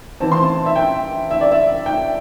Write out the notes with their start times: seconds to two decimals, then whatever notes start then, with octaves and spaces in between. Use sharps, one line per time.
0.20 E3 C4 A5
0.32 C6
0.43 A5
0.66 E5
0.76 G5
1.31 E5
1.41 D5
1.51 E5
1.86 G5